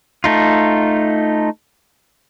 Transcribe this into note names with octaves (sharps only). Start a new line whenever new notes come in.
A3 D#4 F4